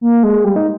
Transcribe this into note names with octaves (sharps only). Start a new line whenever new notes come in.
A#3
G#3
G3
D#4